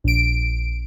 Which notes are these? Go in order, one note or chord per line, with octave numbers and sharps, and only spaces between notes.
A#1 D7